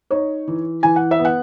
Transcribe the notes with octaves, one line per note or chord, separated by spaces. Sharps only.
D#4 C#5
E3
E3 G#5
F#5
E5
B3
F#5